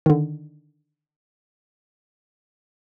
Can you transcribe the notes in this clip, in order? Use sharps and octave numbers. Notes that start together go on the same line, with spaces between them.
D3 D#3